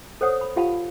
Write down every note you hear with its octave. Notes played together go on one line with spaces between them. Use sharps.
A4 C5 C#5 F#5 D#6
B5
F4 G4 F5 F#5 A5 B5